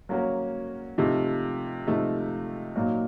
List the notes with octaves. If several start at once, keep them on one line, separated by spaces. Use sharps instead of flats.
F#3 A#3 C#4 F#4 A#4
C3 F3 A3 D#4
C3 F3 A3 D#4
A#2 F#3 A#3 D#4